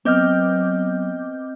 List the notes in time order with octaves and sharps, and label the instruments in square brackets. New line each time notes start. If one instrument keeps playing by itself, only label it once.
[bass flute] F#3 [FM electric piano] B3 D6 G6 [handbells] C4 D#5 F6